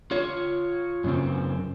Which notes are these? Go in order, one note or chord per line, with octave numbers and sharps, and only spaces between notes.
F4 C#5
F#2 C#3 C4